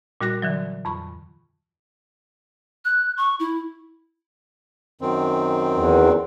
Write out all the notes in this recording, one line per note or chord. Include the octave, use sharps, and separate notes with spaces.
A#2 G3 F#4 F#6 A#6
D3 E3 F#3
F2 B5 C#6
F#6
C#6
E4
F#2 D#3 C4
E2